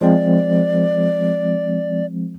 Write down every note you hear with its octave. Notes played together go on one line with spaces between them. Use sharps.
F3 G#3 C4 D5